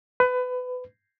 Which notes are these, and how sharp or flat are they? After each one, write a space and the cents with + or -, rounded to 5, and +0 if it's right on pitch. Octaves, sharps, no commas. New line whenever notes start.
B4 +25